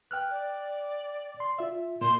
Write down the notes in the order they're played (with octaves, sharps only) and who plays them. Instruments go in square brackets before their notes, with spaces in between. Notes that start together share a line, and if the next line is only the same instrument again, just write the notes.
[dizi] B4 [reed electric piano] G5 F6 F#6
[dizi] D5
[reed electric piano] C6
F4 E5
[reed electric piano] A#2 [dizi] C6